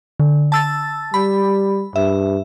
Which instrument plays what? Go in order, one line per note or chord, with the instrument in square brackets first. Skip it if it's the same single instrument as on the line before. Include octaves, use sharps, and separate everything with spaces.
[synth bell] D3
A5 E6 A6
[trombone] G3 [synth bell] B5
[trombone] G2 [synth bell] E5